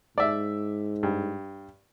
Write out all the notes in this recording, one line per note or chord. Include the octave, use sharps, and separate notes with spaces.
G#2 D5 E5
G2